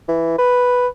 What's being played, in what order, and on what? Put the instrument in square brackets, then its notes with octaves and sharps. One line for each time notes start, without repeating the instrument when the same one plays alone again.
[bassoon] E3
B4